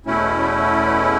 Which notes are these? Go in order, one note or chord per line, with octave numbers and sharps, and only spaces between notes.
E2 B2 A3 C#4 E4